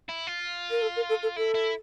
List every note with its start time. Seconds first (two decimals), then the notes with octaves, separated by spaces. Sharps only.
0.09 E4
0.27 F4
0.71 A#4
0.82 A4
0.96 A#4
1.09 A4
1.23 A4
1.36 E4 A4
1.55 E4